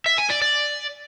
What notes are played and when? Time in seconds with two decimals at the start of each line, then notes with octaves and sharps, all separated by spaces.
0.06 E5
0.18 G#5
0.30 D5
0.42 D5